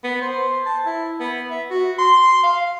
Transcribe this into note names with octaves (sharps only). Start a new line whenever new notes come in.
B3
C5
A5
E4
B3
E5
F#4
C6
F5